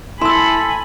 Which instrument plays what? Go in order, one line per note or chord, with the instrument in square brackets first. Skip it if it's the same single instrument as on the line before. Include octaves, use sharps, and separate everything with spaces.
[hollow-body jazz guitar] E4 [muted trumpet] A4 [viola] G#5 B5 [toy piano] C6 E6